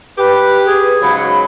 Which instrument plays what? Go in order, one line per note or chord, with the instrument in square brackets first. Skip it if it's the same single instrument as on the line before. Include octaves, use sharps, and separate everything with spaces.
[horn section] G4 [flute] B4
[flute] G#4 [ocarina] B4
[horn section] G#2 C#3 F#3 [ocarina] B5